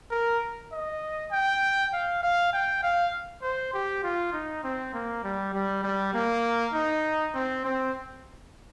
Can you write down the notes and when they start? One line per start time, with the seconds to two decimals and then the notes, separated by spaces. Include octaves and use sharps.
0.11 A#4
0.72 D#5
1.32 G5
1.93 F5
2.23 F5
2.53 G5
2.83 F5
3.42 C5
3.74 G4
4.03 F4
4.33 D#4
4.64 C4
4.94 A#3
5.24 G3
5.54 G3
5.83 G3
6.14 A#3
6.74 D#4
7.34 C4
7.65 C4